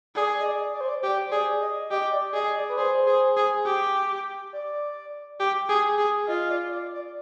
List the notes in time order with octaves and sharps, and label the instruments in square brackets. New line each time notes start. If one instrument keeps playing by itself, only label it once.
[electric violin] G#4 [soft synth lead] D5
[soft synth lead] D#5
D5
D5
C5
D5
[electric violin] G4
[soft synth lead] C5
[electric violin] G#4 [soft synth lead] D5
[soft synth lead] D#5
[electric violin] G4 [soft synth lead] D#5
[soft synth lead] D5
[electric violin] G#4 [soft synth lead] D#5
[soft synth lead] D5
B4
[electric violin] G#4 [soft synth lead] C5
[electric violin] G#4
G#4
G4
[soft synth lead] D5
[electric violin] G4
G#4
G#4
[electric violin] F4 [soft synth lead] D#5
[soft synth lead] D5
D5
D5